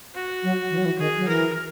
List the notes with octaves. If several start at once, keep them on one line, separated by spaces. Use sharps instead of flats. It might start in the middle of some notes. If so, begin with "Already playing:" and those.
F#4
F#3
E3
F#3
E3
D#3 G#4
F#3
E3 A#4